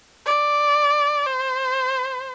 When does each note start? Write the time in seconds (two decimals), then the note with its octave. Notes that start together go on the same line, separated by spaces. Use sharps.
0.26 D5
1.27 C5